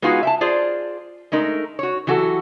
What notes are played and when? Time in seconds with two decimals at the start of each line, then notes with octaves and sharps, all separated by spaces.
0.02 G#3 B3 D#4 F4 F#4 G#4
0.23 E5 G5 A5
0.41 F4 G#4 C5 D5
1.32 G#3 A3 D#4 A#4
1.79 F#4 C#5
2.07 E3 F#3 F#4 G4 A4